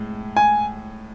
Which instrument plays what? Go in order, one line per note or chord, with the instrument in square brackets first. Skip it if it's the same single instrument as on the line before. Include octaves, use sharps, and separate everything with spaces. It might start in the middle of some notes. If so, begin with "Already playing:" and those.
Already playing: [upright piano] A2 G#3
[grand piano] G#5